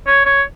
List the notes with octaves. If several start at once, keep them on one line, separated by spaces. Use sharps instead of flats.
C#5
C#5